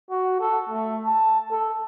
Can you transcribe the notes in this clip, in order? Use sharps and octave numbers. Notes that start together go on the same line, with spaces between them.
F#4
A4
A3
A5
A4